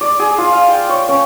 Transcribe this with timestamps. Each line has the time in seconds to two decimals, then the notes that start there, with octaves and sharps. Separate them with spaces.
0.01 D5
0.19 G#4
0.38 F4
0.53 F5
0.68 G5
0.89 C#5
1.09 C#4